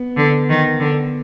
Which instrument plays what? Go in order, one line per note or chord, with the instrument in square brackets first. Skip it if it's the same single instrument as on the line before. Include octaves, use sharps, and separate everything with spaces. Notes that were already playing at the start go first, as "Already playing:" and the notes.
Already playing: [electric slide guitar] B3
[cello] D3
D#3
D3